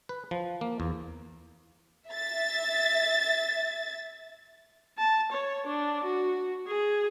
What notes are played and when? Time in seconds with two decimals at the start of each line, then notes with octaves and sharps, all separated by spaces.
0.09 B4
0.31 F3
0.61 A#3
0.80 E2
2.09 E5 A6
4.98 A5
5.32 C#5
5.66 D4
6.04 F#4
6.67 G#4